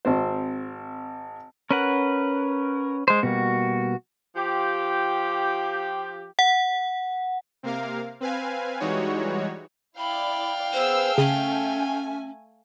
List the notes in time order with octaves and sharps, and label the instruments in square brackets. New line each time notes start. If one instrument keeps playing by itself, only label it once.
[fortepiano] G#1 C4 C5
[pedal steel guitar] C#4 B4 F#5 [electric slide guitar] A#4
[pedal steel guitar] G#3 C5
[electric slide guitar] B2 G3 A#3 [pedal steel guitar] F#4
[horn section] F3 F4 G4
[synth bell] F#5
[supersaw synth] C3 A#3 A#4 F5
C4 B4 F5 G#5
E3 G3 G#3 D#4 F#4 C#5
[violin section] E4 D5 [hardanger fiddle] F5 G5 [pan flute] B5
[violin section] B3 G#4 E6 [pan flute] C5
[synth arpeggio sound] C#3 [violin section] A3 G#5 [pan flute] C#4